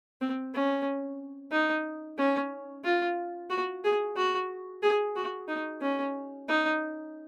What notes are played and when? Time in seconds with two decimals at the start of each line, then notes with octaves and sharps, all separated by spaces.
0.21 C4
0.54 C#4
1.52 D#4
2.18 C#4
2.84 F4
3.50 F#4
3.84 G#4
4.16 F#4
4.82 G#4
5.16 F#4
5.48 D#4
5.81 C#4
6.48 D#4